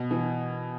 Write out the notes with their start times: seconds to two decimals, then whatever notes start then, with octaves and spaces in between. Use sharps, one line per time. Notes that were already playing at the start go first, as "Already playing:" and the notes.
Already playing: B2
0.11 E3